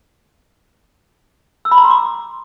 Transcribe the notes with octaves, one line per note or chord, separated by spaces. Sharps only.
E6
B5
A#5
C6
D6